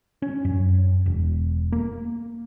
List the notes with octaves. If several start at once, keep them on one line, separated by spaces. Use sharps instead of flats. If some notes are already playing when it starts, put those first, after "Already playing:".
C#4
F#2
E1
A#3